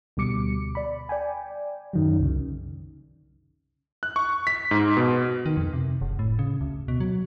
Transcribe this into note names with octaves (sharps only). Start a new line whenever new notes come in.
D2 B2 G3 D6 C#7
D5 B5
D5 G5 G#5
F#2 D#3 F#3
C2 C#3
F#6
C#6
B6
G#2
B2
D#3
F2
C3
F#1
A2
C#3
D2
B2
F#3